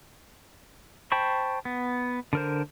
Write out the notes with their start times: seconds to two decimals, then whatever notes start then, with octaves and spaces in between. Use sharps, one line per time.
1.12 C5 G5 A5 B5 C#6
1.65 B3
2.33 D3 A#4 C5